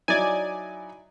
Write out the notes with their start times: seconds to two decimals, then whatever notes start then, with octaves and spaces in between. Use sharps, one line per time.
0.08 F#3 D#4 E4 D5 G#5